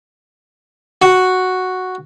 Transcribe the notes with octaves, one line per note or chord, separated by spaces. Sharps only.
F#4